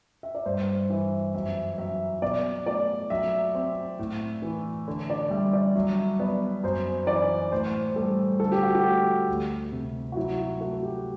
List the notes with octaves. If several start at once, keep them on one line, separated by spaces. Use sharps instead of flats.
E5
D5
G2 C5
E3 E5
F#2 E5
F#3 E5
B2 D5
A3 D5
F#3 E5
C4
A2
E3
D3
D5
G3 E5
D5
F#3 E5
B3 D5
F#2 C5
E3 D5
A2 C5
G3 A4
D3 A4
G4
F#4
G4
A3
D2
C3
F#4
F#3 E4
F#4
A3 F#4
G4